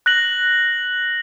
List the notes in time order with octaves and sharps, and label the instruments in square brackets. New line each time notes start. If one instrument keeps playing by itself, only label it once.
[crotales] F#6 A#6 F#7